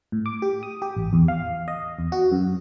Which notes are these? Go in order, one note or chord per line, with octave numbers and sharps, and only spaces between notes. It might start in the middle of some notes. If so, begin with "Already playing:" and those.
A2
D6
G4
D#6
G4
A1
E2
F5
D#5
E2
F#4
F#2